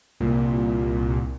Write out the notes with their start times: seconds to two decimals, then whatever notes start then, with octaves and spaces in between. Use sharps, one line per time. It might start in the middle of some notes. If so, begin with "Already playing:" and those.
0.20 C2 A#2